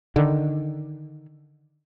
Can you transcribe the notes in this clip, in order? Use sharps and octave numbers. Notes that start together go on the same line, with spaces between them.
D3 D#3